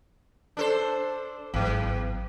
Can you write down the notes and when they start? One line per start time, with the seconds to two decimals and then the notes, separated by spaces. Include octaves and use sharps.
0.57 D4 A4 C5
1.54 G#1 E2 F#3